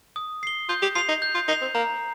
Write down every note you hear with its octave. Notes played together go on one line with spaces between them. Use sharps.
D#6
C7 G7
F4 G6
G4
F4 C7 F7
D#4
G6
F4
D#4 C7 F7
C4
A#3 A#5